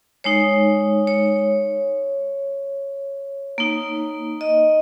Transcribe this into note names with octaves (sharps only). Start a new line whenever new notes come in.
G#3 D#4 C#5
C#5
A#3 D#4
D#5